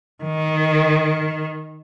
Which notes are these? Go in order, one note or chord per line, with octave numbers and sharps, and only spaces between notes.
D#3